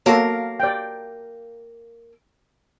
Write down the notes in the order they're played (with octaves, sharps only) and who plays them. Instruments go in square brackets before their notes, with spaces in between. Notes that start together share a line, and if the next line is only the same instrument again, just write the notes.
[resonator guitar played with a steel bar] A#3 A#4 F5 [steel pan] F#4 A4 C#5
[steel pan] D5 G5